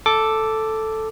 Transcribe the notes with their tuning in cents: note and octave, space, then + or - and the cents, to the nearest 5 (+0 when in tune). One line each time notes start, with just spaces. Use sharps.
A4 +0 D6 +0